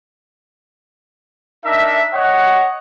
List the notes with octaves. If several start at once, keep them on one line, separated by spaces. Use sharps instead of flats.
D4 D#4 A#4 E5
C#5 D#5 F#5